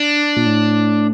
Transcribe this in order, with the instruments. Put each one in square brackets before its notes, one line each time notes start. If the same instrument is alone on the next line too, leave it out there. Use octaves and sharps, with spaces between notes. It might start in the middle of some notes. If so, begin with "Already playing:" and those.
Already playing: [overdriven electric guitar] D4
[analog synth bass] A#2
A2